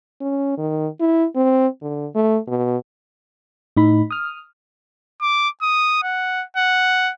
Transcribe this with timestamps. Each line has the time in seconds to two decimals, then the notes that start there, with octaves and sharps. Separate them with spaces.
0.21 C#4
0.57 D#3
1.01 E4
1.36 C4
1.82 D3
2.15 A3
2.47 B2
3.77 A2 D#4 B5
4.11 D#6 F6
5.22 D6
5.62 D#6
6.03 F#5
6.57 F#5